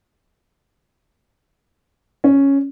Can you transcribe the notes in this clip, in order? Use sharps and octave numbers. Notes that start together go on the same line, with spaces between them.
C#4